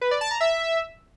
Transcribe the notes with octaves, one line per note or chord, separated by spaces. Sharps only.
B4
D5
A5
A#5
E5